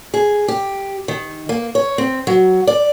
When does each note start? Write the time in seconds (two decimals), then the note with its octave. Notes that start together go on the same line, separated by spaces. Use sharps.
0.14 G#4
0.48 G4
1.08 D#3
1.49 A#3
1.75 C#5
1.98 C4
2.27 F#3
2.67 D5